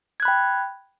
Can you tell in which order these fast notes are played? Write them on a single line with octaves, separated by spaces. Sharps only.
G#6 F#6 B5 G5